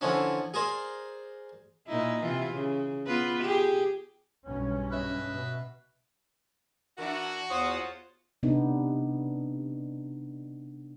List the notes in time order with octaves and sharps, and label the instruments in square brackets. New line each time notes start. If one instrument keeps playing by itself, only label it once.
[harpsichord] D3 E3 F3 C#4 D4
G#4 A#4 C5 D5
[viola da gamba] A#2 D#4 E4
C3 E3 F4
C#3
B3 F4 B4
G4 G#4
[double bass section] B1 G2 C#4
[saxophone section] B4 D#5 E5
[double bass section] B2
[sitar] E3 D4 E4 [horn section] F#4 [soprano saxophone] A#4
[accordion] E2 D#6 [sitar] F4 C#5 [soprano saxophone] C5
[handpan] C3 B3 D4 D#4